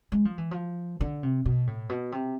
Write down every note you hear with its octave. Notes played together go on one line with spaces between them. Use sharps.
G#3
F3
E3
F3
D3
C3
B2
A2
B2
C3